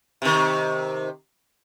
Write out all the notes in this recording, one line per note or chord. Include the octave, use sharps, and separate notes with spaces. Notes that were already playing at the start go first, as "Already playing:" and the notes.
C3 D#3